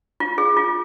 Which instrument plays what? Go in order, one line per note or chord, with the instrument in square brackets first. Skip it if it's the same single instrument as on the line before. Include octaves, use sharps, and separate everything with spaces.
[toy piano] F4
G#4
F4